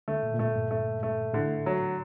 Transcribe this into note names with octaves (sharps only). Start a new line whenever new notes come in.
D3 A3
A#2
A#2
A2 A3
G2
A3
A3
A2 D3
F#3